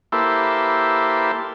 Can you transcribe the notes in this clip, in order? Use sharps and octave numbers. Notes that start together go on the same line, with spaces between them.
A#3 E4 G4 A4 B4 C5